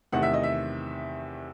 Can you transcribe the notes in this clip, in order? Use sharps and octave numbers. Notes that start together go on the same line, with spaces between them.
E2 C3 D#3 A3 F#5
E5
D#5
E5